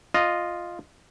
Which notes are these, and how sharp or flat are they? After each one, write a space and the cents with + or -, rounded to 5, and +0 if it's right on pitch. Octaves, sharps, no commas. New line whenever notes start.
F4 +0 D#5 -10